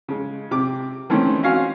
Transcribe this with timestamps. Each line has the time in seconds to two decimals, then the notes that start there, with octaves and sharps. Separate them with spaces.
0.08 C#3 G#3
0.51 C3 D6
1.10 D#3 E3 A3 C4 C#4
1.43 C4 C#4 F#4 C#5 F5 G#5